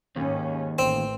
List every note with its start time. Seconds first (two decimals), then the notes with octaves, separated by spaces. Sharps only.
0.16 D#2 G#2 C#4
0.79 A1 C4